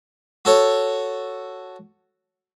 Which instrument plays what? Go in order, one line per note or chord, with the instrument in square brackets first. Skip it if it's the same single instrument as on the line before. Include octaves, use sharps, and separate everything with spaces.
[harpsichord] F#4 A4 C#5